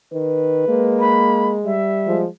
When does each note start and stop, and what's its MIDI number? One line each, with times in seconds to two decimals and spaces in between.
0.13 0.66 51
0.13 1.22 71
0.68 1.77 56
0.68 1.58 58
1.00 1.47 83
1.65 2.25 55
1.65 2.18 76
2.07 2.27 53
2.07 2.27 56